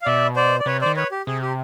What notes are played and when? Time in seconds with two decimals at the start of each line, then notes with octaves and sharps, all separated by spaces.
0.02 F5
0.06 B2 D5 E5
0.36 C5 D5
0.60 D5
0.66 C3 B4 C#5
0.81 D#3 C5 D5
0.96 B4 C#5
1.12 G4
1.27 C3 G#4
1.42 G4